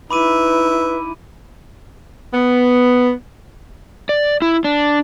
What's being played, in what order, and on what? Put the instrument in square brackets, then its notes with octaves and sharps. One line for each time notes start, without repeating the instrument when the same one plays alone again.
[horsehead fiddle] D#4 E4 [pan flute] B4 [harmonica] E5 [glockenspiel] B5 D6 D#7
[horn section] B3
[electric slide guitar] D5
E4
D4